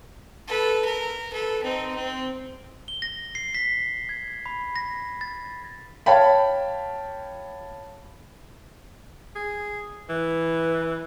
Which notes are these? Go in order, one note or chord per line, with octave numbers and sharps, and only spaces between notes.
A4 B4
A#4
A4 B4
C4 D#4
C4
G7
A#6
C7
B6
G#6
B5
A#6
A6
C#5 F5 G5 A5 B5
G#4
E3 B4